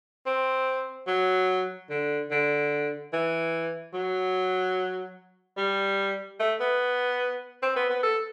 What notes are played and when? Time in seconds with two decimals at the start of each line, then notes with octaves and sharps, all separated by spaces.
0.26 C4
1.07 F#3
1.90 D3
2.31 D3
3.13 E3
3.94 F#3
5.57 G3
6.40 A3
6.60 B3
7.63 C4
7.76 B3
7.90 B3
8.03 A4